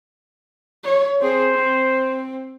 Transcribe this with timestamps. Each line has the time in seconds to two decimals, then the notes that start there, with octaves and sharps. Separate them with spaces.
0.84 C#5
1.21 C4 G#4 C5
1.54 C4